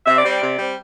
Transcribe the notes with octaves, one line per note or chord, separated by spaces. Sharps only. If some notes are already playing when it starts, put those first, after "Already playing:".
C3 E5
D5
G3 C4
D5
C3
G3 C4